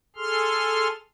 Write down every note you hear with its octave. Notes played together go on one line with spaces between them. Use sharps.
G#4 A4 C6 F6